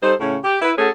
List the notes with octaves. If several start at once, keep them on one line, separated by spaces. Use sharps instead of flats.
G3 D#4 A4 C5
A2 C#3 C#4
G4
E4 B4
A3 C#4 F#4 G#4 A4